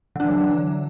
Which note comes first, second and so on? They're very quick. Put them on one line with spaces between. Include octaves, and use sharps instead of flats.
D3 D4 E3 F#3